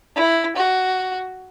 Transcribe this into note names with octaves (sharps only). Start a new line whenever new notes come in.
E4
F#4